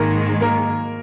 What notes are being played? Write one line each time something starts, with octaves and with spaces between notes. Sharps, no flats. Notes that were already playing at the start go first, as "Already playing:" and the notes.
Already playing: G#2 D#3 G#3 A#3 A#4
A#3 A#4